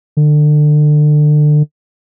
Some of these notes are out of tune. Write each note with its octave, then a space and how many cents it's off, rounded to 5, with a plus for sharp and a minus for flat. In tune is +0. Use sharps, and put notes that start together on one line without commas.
D3 +30